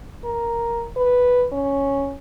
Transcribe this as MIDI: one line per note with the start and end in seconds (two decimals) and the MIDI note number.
0.24 0.86 70
0.97 1.46 71
1.52 2.16 61